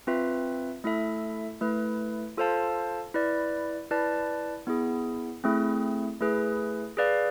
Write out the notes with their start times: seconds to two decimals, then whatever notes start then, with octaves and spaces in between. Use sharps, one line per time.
0.07 C4 F4 B4 E5
0.84 A3 E4 A4 E5
1.61 A3 E4 B4
2.37 F4 A4 C5 F5 A5
3.14 E4 B4 D5
3.91 E4 B4 D5 A5
4.67 B3 E4 G#4
5.44 A3 C4 E4 G#4
6.21 A3 E4 G#4 B4
6.97 G#4 B4 D5 F5